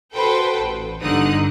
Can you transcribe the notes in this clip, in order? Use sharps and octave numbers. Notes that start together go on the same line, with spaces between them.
F#4 A4 B4 C5 G5
A1
G1 D3 D#4 D#6 F#6